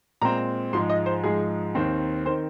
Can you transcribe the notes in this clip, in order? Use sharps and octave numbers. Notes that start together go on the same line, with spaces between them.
A#2 G#3 C4 A#5
G#2 F3 G#3 C6
D#5
C5
G#2 F3 G#3 G#4
D#2 D#3 C4
D#3 C4 C5